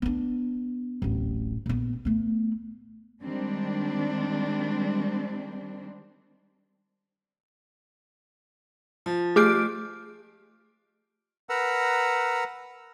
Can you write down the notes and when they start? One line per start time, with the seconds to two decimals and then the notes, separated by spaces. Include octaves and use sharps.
0.02 B3 D4
1.02 D1 A1
1.66 A#1 B3
2.05 A3 B3
3.22 D#3 G3 G#3 C4 D4
9.06 F3
9.36 A3 G4 G#4 D6 F6 G6 D7
11.49 A#4 B4 F#5 A#5 E6